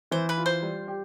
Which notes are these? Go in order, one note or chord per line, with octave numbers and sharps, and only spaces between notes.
E3 C5
B4
F4
C5
G3
G4